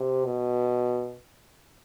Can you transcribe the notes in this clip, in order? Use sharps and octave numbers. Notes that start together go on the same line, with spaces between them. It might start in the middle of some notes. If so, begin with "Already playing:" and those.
Already playing: C3
B2